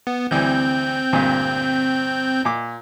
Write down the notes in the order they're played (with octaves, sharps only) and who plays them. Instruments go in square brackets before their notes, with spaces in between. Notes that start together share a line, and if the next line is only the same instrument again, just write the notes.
[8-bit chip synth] B3
[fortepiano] D2 E3 G3 [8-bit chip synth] C4 G6
[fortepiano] D2 G2 A#2
A#2 D6